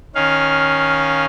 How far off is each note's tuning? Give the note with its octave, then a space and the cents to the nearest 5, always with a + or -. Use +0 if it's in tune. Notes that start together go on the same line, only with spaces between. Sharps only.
D#3 +0 C#4 +0 F5 +0